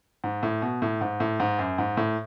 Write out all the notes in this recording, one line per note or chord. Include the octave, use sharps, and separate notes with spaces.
G#2
A2
B2
A2
G#2
A2
G#2
F#2
G#2
A2